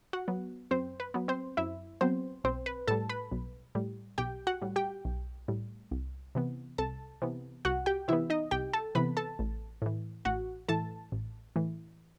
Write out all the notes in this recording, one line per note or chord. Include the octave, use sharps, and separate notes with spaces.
F#4 F#5
F#3 B3
F#2 C4 C5
B4
F#3 B3
C4 C5
F#2 E4 E5
F#3 B3 C4 C5
B1 C4 C5
B4
A2 G3 A4 A5
B4 B5
B1
A2 G3
B1 G4 G5
F#4 F#5
A2 G3
G4 G5
B1
A2 G3
C2
C3 E3 B3
C2 A4 A5
C3 E3 B3
C2 F#4 F#5
G4 G5
C3 E3 B3 E4 E5
D#4 D#5
C2 G4 G5
A4 A5
C3 E3 B3 B4 B5
A4 A5
A1
A2 E3
A1 F#4 F#5
A2 E3 A4 A5
A1
A2 E3